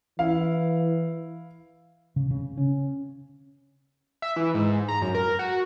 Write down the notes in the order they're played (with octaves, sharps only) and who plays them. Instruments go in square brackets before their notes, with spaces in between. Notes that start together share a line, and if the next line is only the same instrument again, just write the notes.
[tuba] E3 [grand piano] E4 F5
[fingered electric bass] C#3
C#3
C#4
[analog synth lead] E5
E3
G#2
A#5
F#2
A#4
F#4